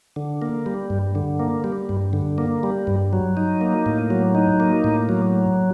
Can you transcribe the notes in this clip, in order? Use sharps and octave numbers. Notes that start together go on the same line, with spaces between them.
D3
A#3
G3
G2
D3
A#3
G3
G2
D3
A#3
G3
G2
F#3
D#4
A#3
A2
F#3
D#4
A#3
A2
F#3